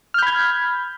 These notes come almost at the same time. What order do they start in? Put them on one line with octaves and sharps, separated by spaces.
F6 G6 B5 G#6